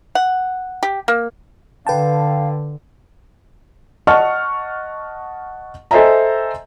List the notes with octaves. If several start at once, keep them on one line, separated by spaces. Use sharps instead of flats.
F#5
G4
A#3
D3 B4 F5 G5 A5
D#5 F#5 A5 C#6 F6
A4 C5 D#5 E5 G#5 A#5